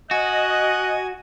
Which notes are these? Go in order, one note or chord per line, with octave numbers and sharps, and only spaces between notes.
F#4 D#5 G#5 F#6